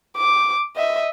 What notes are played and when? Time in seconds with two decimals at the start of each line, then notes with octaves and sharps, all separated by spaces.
0.18 D6
0.76 D#5 E5